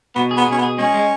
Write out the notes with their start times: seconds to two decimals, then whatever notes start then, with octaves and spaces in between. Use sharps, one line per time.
0.15 B2 B3
0.31 G#4
0.37 B3
0.48 B2 C#4
0.58 B3
0.63 G#4
0.78 G#3 C#4
0.94 G#3